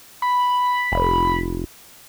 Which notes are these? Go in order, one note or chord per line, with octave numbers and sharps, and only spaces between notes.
B5
F1